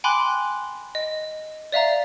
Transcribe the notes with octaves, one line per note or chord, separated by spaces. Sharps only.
G5 G#5 B5 C6 D6 F#6
D#5
D5 E5 F5 A#5